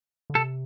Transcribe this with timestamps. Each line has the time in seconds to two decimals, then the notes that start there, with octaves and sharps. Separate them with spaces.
0.30 D3
0.34 C3 A4